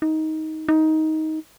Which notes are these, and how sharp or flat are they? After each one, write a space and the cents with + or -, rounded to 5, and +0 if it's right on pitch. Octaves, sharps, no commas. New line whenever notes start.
D#4 +15
D#4 +15